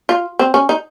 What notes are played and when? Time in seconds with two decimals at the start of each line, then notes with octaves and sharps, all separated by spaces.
0.09 F4
0.39 C4
0.54 C#4
0.69 D#4